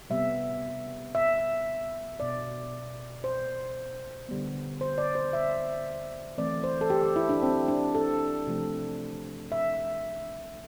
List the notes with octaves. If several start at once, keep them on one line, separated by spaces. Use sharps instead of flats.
C3 G3 B3 E5
E5
B2 B3 D5
C5
D3 G3 B3
C5
D5
C5
E5
E3 A3 C4 D5
C5
A4
G4
G4
E4
D4
C4
D4
A4
C3 F3 A3 C4
E5